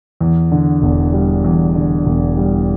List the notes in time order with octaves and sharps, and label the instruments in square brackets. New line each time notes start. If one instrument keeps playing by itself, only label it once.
[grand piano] E2
D3
E1
G3
E2
D3
E1
G3